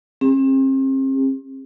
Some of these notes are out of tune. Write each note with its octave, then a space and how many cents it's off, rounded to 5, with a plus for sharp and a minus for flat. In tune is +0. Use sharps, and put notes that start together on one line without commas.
C4 +40 G#4 -45